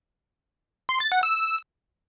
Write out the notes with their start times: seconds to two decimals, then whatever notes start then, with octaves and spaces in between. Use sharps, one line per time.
0.89 C6
1.00 A6
1.12 F#5
1.23 E6